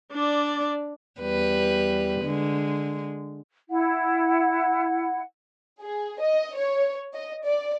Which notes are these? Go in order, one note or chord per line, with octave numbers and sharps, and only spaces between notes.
D4 D5
E2 G3 B4
D3 G#3
E4 F#5
G#4
D#5
C#5
D#5
D5